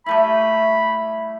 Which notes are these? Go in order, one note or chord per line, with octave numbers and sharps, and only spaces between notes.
G3 A3 E4 B5